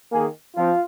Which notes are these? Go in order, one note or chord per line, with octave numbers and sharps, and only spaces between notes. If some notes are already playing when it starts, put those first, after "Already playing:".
D#3 A#3 G#4
F3 C4 F4